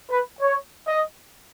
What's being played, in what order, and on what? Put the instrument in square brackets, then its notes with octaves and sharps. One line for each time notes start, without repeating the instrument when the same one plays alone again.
[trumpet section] B4
C#5
D#5